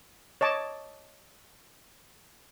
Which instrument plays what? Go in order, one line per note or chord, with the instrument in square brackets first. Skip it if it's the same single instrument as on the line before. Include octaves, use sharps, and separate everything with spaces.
[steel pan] C#5 D#5 A5 D6